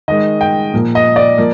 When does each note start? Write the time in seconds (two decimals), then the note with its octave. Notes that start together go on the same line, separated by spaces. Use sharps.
0.08 D#3 G#3 D#5
0.41 G5
0.73 A#2 F3 A#3
0.95 D#5
1.16 D5
1.38 F3 A#3